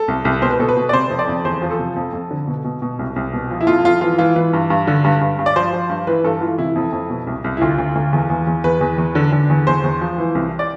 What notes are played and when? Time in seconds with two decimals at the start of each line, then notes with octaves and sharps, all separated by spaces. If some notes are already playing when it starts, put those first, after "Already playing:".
Already playing: A4
0.08 C2
0.25 C2
0.42 B2 C5
0.50 B4
0.59 B2 A4
0.69 B4
0.77 B2
0.89 D5
0.93 C3 C5
1.10 F2
1.19 D5
1.28 F2
1.45 E2 C5
1.62 F3
1.70 A4
1.79 C3
1.96 F2
2.13 F2
2.31 D3
2.48 B2
2.65 B2
2.82 B2
2.99 C2
3.16 C2
3.33 B2
3.51 F3
3.61 E4
3.67 F2 F4
3.85 F2 F4
4.01 E3 F4
4.18 E3 F4
4.36 E3 B4
4.53 G2
4.70 G2
4.87 D3
5.04 G2
5.21 G2
5.39 G2
5.46 D5
5.56 F3 C5
5.73 F3
5.89 G2
6.07 E3 B4
6.24 G2 A4
6.41 E3 F4
6.58 C3 E4
6.75 F2
6.92 F2
7.10 B2
7.27 C2
7.44 C2
7.57 E4
7.61 D2 F4
7.78 D2
7.95 D2
8.13 E2
8.30 E2
8.47 E2
8.64 E2 B4
8.81 E2
8.98 E2
9.15 D3
9.32 D3
9.49 E2
9.67 E2 C5
9.84 E2
10.01 F3
10.18 E3
10.35 C2
10.59 D5